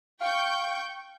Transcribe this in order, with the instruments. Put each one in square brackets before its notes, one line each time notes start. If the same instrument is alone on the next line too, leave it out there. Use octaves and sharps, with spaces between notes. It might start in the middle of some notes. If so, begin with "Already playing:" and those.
[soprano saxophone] F5 [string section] G5 C#6 G6